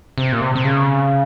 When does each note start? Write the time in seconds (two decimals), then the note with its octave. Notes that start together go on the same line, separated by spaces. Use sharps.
0.18 C3
0.32 A#2
0.41 C3
0.56 C3
0.64 C#3